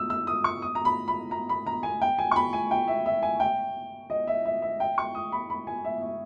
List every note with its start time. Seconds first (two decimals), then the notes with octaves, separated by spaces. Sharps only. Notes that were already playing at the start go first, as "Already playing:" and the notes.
Already playing: D#6 E6
0.10 E6
0.27 D#6
0.44 C#6
0.62 D#6
0.75 A#5
0.85 B5
1.08 B5
1.31 A#5
1.49 B5
1.67 A#5
1.83 G#5
2.02 G5
2.18 G#5
2.31 C#6
2.36 B5
2.53 G#5
2.71 G5
2.88 E5
3.06 E5
3.23 G#5
3.40 G5
4.10 D#5
4.27 E5
4.45 E5
4.62 E5
4.80 G5
4.98 C#6
5.15 D#6
5.32 B5
5.50 B5
5.67 G#5
5.84 E5
6.02 E5